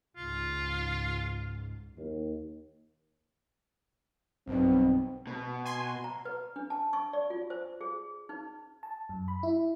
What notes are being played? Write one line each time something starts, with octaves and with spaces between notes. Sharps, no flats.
C#2 G#2 F4
D#2
B1 G2 B2 C4
B2
G#5 C6
A#5
B4
D4
A5
C#6
D5
F4
C5
G#4
D#4
A5
F#2
B5
E4